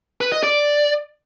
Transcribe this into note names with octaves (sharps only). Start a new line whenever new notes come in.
B4
D#5
D5